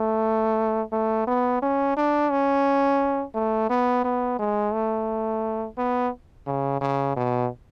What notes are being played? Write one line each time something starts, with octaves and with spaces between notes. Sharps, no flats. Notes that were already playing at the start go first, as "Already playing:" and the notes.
Already playing: A3
A3
B3
C#4
D4
C#4
A3
B3
B3
G#3
A3
B3
C#3
C#3
B2